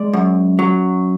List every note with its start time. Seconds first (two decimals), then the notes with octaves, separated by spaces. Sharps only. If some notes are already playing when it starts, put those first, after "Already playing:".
Already playing: G#3 D5
0.13 F#2
0.59 F#3